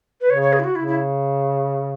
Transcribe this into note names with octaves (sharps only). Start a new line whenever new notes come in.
B4
C#3 C#5
C#5
G#4
E4
F#4
C#3 E4
E4